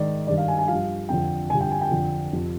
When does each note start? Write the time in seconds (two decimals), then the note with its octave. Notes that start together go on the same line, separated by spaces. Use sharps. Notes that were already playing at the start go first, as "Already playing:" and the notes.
Already playing: G#2 D#3 D5
0.27 G2 D#3 D5
0.38 F5
0.48 G#5
0.59 G#5
0.68 G2 F3 F5
1.09 F2 D3 F3 G5
1.50 G2 D3 F3 G#5
1.61 G5
1.71 G#5
1.81 G5
1.91 F2 D3 F3
2.33 F2 C3 F3